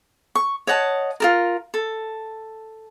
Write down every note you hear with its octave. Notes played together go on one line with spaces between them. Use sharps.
C#6
C#5 D#5 F#5 A5
F4 A4 A#4
A4